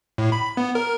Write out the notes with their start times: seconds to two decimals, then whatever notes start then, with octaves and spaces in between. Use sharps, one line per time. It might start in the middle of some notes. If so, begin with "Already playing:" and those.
0.18 A2
0.32 B5
0.57 B3
0.75 A#4